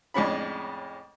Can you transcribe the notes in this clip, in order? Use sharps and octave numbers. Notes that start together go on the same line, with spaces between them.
F2 A2 G#3 C#4 D4 B5